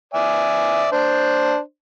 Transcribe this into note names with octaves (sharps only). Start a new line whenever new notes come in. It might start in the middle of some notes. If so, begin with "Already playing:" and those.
D5 E5 G#5
D4 C5